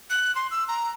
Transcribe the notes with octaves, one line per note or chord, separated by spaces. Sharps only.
F#6
C6
E6
A#5